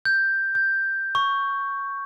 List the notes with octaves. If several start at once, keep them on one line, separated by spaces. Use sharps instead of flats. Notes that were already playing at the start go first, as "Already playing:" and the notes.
G6
G6
C#6